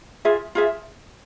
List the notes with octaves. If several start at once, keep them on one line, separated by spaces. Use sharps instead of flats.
F4 G#4 E5
F4 G#4 E5